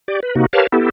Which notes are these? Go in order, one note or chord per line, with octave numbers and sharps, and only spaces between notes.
G4 D5
B4
C3 A#3 D#4 F#4
G4 A#4 B4 C#5 F5 A5
B3 E4 G4 A4